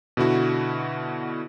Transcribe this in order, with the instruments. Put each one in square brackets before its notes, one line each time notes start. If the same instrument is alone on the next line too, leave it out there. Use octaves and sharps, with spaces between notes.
[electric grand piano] B2 D3 E4 F#4